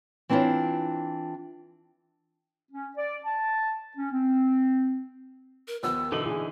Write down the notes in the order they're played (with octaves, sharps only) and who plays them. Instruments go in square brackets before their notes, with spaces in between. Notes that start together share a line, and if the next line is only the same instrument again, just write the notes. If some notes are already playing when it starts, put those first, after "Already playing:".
[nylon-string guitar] E3 C4 D4 E4 F4 C#5
[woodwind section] C#4
D5
A5
C#4
C4
[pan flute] A#4
[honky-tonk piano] D#2 F3 B3 [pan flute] E6
[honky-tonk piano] B2 F#7 [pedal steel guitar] D3 E3 D#4 [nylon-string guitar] A4
[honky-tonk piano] A#2 G#5 [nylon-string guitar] G#4